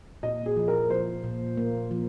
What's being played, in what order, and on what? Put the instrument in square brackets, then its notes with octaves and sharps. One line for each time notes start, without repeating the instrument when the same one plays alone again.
[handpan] A#2 [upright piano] D#5
[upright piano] G#4
[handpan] F3
[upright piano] A#4
[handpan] F3 [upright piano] C5
[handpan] A#2
A#3
F3